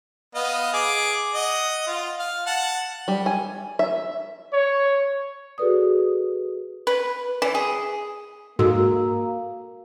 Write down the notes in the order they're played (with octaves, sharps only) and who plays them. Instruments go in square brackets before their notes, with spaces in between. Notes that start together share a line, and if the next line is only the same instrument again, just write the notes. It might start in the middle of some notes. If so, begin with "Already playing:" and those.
[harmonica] B3 D#5 F5
G#4 D6
D#5 F#5
F4
F5
F#5 A5
[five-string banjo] G3
G#5
E5
[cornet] C#5
[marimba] F#4 G#4 A4 B4 D5 D#6
[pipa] B4
E3
G#4
[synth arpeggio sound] G#2 [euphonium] A#3 [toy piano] F#4 A4 E6